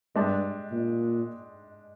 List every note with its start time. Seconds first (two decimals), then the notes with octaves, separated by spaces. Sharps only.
0.15 G2 G#3 D4 G4
0.71 A#2